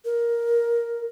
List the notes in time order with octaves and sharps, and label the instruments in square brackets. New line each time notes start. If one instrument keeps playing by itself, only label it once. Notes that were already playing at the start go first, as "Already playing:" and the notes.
[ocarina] A#4